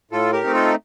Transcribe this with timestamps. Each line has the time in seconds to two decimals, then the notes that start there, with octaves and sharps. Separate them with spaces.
0.11 A2 F4 A4
0.32 G4 A#4
0.43 A3 C4 D#4
0.54 F4 A4